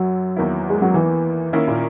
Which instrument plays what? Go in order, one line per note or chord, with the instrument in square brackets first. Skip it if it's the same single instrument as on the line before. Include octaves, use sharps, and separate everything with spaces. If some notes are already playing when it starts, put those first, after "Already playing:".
Already playing: [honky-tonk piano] F#2 [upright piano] F#3
[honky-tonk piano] E2 D#3 A#3 E4
[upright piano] G#3
F#3
E3
[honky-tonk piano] D#3 A#3 C#4 E4 A#4
[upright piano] A#2